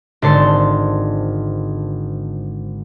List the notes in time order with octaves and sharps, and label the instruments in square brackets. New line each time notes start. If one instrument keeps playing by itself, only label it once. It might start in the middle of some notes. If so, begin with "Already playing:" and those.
[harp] G#1 D3 C5 A5 C6 C#7